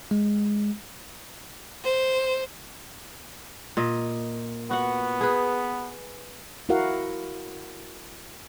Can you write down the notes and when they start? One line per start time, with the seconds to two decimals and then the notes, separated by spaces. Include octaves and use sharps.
0.11 G#3
1.84 C5
3.77 A#2 D#5
4.71 B3 F#4 F#5
5.21 G#4 B4
6.69 E4 F#4 A#4 F5 F#5